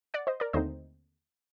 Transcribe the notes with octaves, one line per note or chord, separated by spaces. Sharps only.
D5 F#5
C5 D#5
A#4 D5
D#2 D3 A3 C4 D#4 C5 D#5